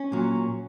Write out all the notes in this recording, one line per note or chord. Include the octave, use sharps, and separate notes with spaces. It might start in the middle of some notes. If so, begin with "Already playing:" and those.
Already playing: C#4
A#2 F#3